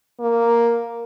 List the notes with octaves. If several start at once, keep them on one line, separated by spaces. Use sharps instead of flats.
A#3